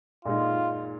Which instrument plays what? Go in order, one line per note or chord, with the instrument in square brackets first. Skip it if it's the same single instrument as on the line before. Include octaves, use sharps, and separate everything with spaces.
[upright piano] A#2 G#3 D#4 [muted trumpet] F4